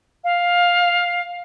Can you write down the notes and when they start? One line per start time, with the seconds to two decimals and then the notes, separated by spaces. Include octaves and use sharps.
0.24 F5